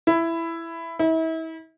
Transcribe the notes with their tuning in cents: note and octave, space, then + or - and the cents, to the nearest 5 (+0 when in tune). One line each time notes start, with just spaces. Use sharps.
E4 +10
E4 -35